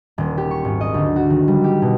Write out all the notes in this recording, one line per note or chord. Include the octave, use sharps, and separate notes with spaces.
D#1
G4
C#6
G#1
D#5
D2
F#4
D#3
G3
G4
B2